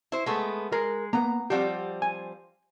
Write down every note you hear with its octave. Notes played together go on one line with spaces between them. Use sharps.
E4 C5
G#3 A3 B3
G#3 A#4 A#5
A#3 B3 A#5
F3 G3 C4 G4 F#5
G#5